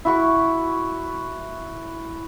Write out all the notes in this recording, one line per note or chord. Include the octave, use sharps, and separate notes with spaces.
E4 F#4 C#6